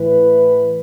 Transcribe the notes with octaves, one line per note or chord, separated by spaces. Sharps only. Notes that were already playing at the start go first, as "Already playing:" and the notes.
Already playing: A2 E3 B4